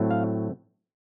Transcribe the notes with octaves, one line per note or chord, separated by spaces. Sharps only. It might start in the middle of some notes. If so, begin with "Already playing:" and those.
Already playing: A2 F#3 A3 C4
F5